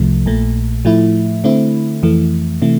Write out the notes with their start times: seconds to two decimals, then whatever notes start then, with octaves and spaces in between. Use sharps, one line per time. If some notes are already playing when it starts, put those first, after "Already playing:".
Already playing: C2 C3 F3 A3
0.26 A#1 A#2 A3
0.85 A2 F3 A3 E4
1.44 D3 A3 C4 E4
2.03 F2 E3 A3
2.62 C3 E3 A3